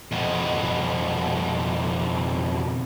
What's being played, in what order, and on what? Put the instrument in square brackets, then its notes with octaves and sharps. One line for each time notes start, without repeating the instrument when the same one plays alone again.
[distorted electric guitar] F2 B2